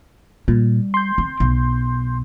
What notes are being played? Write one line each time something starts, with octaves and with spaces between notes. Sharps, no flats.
A#2 G3
C6 G6
C4
B1